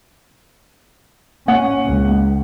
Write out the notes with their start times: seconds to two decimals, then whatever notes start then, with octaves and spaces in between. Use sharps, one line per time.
1.48 A#3 C#4 F#5
1.86 C#2